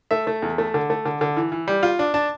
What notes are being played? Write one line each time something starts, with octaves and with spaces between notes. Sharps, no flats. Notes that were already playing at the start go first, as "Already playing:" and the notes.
A3 E5
A3
E2
A3
D3
A3
D3
D3
E3
E3
G3
F4
D4
D4 A5